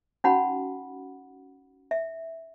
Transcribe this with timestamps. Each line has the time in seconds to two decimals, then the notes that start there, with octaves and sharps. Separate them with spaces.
0.24 C#4 D#4 F#4 F#5 B5
1.91 E5